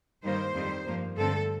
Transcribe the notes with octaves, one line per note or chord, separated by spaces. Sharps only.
G2 D#3 G3 A#3 C5
F2 D#3 G3 C4
G2 F3 A#3
G2 D3 A3 C4 A4